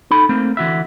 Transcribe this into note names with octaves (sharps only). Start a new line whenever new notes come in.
D#4 A4 B5
A3 A#3 C4
D3 E3 F#4 E5